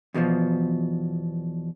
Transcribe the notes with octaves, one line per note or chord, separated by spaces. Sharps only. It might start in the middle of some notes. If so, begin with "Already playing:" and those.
E2 B2 D#3 F3